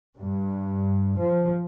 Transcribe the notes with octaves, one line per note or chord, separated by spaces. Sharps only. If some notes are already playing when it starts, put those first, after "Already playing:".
G2
F3